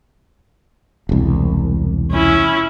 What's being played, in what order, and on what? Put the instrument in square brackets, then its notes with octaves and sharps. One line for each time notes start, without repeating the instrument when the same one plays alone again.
[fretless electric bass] E1 C2
[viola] C#4 E4